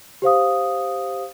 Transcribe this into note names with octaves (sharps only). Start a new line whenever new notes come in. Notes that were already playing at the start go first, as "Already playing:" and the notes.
G4 C5 F5 D#6